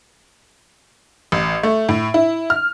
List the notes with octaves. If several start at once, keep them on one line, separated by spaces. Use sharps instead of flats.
A1
A3
A2
E4
F6